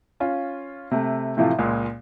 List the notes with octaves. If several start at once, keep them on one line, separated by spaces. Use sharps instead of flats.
C#4 F4
C3 A3
A2 C3 E3 F3 A3 F4
C#2 A#2 G#3